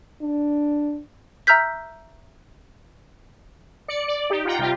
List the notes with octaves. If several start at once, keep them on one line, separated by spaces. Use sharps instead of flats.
D4
E5 A#5 E6 F6 G6 B6
D5 C#7
D5
D#4 G4
F4 F#5 G5 A#5
C3 G3 F4 G4